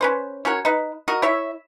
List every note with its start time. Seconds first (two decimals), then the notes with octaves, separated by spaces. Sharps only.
0.01 C#4 B4 C5
0.45 C#4 F#4 A#4 C#5
0.65 D#4 B4
1.08 F#4 A#4 D#5
1.22 E4 C#5 E5